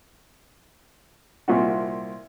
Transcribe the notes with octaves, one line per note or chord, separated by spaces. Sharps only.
C2 A#2 F4 F#4